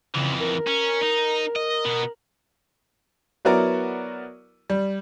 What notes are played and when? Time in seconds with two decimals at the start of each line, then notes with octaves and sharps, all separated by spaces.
0.15 F2 C#3 E3
0.40 A#4
0.67 C#4
1.03 D#4
1.56 D#5
1.85 B2 B3
3.45 F#3 B3 E4 F#4 A#4 D5
4.70 G3